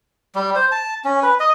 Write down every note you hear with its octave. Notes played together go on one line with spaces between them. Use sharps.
G3
C5
A5
C#4
B4
D#5